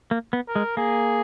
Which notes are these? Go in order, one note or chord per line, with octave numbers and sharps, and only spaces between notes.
A#3
B3
A#4
G#3
A#3 G#4